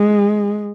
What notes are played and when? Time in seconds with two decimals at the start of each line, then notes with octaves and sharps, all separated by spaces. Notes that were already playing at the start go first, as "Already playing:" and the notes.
Already playing: G#3